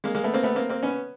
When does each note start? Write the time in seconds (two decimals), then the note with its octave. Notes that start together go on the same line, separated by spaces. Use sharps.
0.04 G#3 A#3
0.15 G#3 A#3
0.24 A3 B3
0.34 A#3 C4
0.43 A3 B3
0.56 A#3 C4
0.69 A#3 C4
0.83 B3 C#4